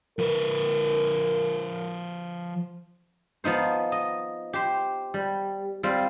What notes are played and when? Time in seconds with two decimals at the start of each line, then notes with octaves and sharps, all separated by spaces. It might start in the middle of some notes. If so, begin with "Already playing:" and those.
0.19 F3 A#4 B4
3.44 F3 B3 D#4 C5
3.92 D#5
4.53 G4 C5
5.14 G3
5.83 G3 C4 F4